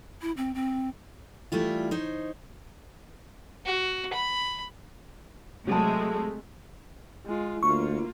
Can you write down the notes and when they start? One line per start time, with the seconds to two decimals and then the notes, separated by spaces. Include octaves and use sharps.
0.22 E4
0.37 C4
0.55 C4
1.52 E3 G3 A3 E4 F4
1.91 D#4 C5 C#5
3.65 F#4
4.13 B5
5.67 C3 F#3 G#3 A3 A5
7.26 G#3 F4
7.63 D2 A#3 F4 C#6